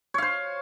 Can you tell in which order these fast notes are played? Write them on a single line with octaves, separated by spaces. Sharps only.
C#5 F5 C5